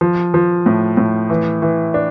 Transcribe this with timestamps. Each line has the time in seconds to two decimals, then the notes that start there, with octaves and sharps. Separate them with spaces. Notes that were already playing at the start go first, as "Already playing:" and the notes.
0.01 F3
0.34 F3
0.66 A2
0.97 A2
1.30 E3
1.62 E3
1.94 D4